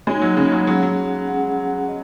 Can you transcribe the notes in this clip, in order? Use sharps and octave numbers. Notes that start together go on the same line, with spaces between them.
G#3 A#3 D#4 F#4 C#5
F#3
C#3
F#3
F#3 C#4 G#4 F#5
F#3
C#4 G#4 F#5
D#5